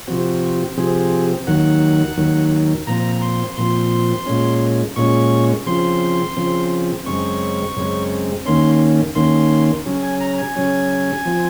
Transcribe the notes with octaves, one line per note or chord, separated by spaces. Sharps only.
C3 F3 C4 F#4
C3 F3 C4 G#4
D#2 D#3 F#3 F#5
D#2 D#3 F#3
A#2 F3 C4 A#5
C6
A#2 F3 C4 C6
A#2 G#3 C#4
A#2 G#3 C#4 C#6
C#3 F3 C4 C6
C#3 F3 C4
F#2 C#3 G#3 C4 C#6
F#2 C#3 G#3 C4
D#2 D#3 A#3 C#4 C6
D#2 D#3 A#3 C#4 C6
C#3 F#3 C#4
G#5
A#5
G#5
C#3 F#3 C#4
F3 C4